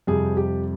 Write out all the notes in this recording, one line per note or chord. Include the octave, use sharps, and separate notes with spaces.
F2 C3 G3 G#4
G4